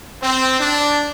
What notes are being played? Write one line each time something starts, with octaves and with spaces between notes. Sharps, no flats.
C4
D4